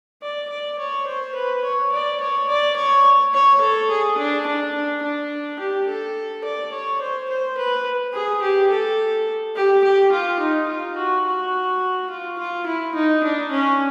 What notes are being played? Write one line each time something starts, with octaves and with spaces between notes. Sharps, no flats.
D5
D5
C#5
C5
B4
C#5
D5
C#5
D5
C#5
C#5
A4
G#4
D4
D4
D4
D4
G4
A4
D5
C#5
C5
C5
B4
G#4
G4
A4
G4
G4
F4
D#4
F4
F#4
F#4
F4
F4
E4
D#4
D4
C#4